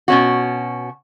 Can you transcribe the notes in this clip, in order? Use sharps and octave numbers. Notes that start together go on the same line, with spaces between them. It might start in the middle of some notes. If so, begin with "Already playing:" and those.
B2 C#4 F#4